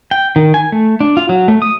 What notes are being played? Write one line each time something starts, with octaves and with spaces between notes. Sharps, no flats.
G5
D#3
G#5
A3
D4
F4
F#3
A3
D#6